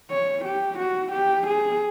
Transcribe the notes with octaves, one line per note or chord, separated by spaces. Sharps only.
C#5
G4
F#4
G4
G#4